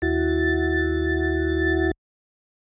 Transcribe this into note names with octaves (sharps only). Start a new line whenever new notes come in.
D#2 E4 F#4 A6